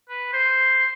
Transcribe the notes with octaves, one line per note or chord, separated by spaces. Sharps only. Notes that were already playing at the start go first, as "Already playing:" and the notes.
B4
C5